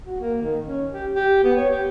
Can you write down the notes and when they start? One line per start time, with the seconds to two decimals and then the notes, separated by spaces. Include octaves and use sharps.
0.06 F#4
0.20 A#3
0.42 D#3
0.65 C#4
0.92 G4
1.14 G4
1.44 B3
1.57 C#5
1.70 G4